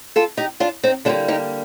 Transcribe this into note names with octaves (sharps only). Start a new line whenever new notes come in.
F4 A4
D#4 G4
D4 F4
C4 D#4
D3 G3 A#3 D4 F4
D#4 G4